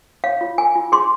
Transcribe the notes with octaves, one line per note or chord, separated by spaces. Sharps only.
C#5 F5
F4
A#4 G#5
F4
G#4 C6